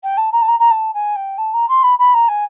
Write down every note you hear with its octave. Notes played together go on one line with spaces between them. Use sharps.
G5
A5
A#5
A5
A#5
A#5
A5
G#5
G5
A5
A#5
C6
B5
B5
A#5
G#5